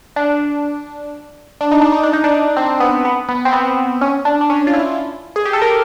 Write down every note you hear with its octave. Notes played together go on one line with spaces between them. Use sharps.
D4
D4
D#4
D4
D#4
D4
D#4
D4
C4
B3
B3
B3
C4
B3
C#4
D4
D4
C#4
F4
E4
G#4
G4
A4
A#4